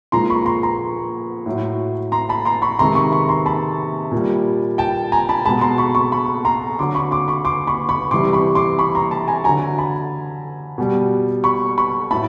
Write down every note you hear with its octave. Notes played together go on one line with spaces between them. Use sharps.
A#2 F3 G#3 A#5 C6
B5 C#6
A#5 C6
A#5 C6
A2 F#3
A#5 C6
A5 B5
A#5 C6
B5 C#6
C3 D#3 G#3 A#5 C6
B5 C#6
B5 C#6
A#5 C6
A5 B5
A#2 G3
G5 A5
G#5 A#5
A5 B5
B2 G#3 A5 B5
A#5 C6
B5 C#6
B5 C#6
B5 C#6
A#5 C6
D3 F#3 C6 D6
B5 C#6
C6 D6
B5 C#6
C6 D6
B5 C#6
B5 C#6
C3 E3 G3 C6 D6
B5 C#6
C6 D6
B5 C#6
A#5 C6
A5 B5
G#5 A#5
D3 F#3 G#5 A#5
A5 B5
B2 G3
B5 C#6
B5 C#6
A2 F#3 A5 B5